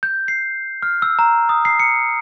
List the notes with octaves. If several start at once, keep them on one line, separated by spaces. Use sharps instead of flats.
G6
C7
F6
E6
A#5
D#6
C7
C#7